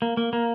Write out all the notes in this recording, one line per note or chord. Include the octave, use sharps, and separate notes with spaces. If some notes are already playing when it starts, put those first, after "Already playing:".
A#3
A#3
A#3